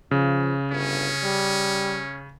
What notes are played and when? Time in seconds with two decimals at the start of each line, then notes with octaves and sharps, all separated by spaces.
0.11 C#3 F3
0.71 G1 C#4
1.23 G3